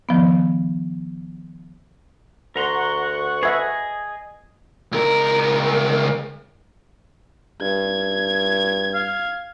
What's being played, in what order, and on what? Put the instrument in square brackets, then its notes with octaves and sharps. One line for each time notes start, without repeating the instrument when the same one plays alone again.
[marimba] D#3 F3 B3
[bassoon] D2 [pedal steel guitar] A#4 A#5 C6 [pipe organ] F#5 C#6
[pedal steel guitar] G#4 D#5 [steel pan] B4 E5
[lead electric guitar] C#2 A#4
[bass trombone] G2 [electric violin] G#6
[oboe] F5